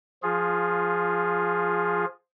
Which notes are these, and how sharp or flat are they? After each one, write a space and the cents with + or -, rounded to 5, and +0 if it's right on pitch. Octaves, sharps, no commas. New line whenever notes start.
F3 -5 F4 +15 G#4 +0